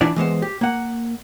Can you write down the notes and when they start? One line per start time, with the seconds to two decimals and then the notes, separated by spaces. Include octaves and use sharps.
0.01 E3 D4 E4 D5
0.16 E3 G#3 B3 C5
0.42 G4
0.61 A#3 F#5